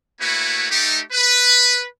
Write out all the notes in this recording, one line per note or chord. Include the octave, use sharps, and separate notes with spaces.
A3 A#3 E4 F#4 B4 C#5
A3 D#4 G4
B4